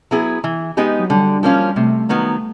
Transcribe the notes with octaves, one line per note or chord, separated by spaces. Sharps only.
F#3 B3 E4 G#4
E3
G#3 B3 D#4 G4
F#3
D3 G3
F3 A#3 C#4 F4
C3 A3
D#3 F#3 B3